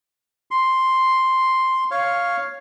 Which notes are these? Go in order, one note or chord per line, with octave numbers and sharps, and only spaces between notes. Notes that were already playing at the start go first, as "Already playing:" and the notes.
C6
C#5 F5